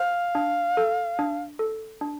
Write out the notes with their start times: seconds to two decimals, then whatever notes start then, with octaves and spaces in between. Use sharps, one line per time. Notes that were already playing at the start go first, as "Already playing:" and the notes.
Already playing: C5 F5
0.35 D4
0.77 A4
1.19 D4
1.59 A4
2.01 D4